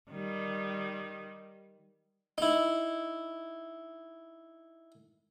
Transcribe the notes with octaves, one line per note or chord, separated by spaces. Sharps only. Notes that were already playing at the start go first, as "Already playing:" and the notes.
D#3 G3
D#4 E4